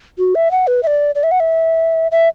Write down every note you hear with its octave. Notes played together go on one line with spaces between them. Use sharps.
F#4
E5
F#5
B4
E5
D5
D5
E5
F#5
E5
E5